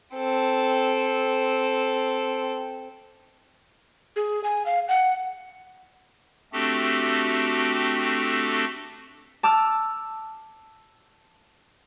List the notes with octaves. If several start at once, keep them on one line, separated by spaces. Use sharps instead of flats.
C4 A4
G#4
G#5
F5
F#5
A3 C4 D4 F#4 G4 A4
A5 D6 E6 F6